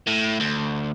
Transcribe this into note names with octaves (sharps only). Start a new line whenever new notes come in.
A2
D2